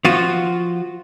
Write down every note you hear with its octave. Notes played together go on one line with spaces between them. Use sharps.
F3 F4 F#4